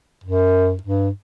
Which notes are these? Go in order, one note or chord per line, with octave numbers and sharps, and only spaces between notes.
F#2
G2